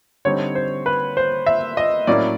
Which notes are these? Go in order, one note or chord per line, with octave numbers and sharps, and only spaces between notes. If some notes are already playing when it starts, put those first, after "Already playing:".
D3 G3 C4 D#4 C#5
C5
B4
C5
E5
D#5
A2 F#3 A#3 C#4 E4 D5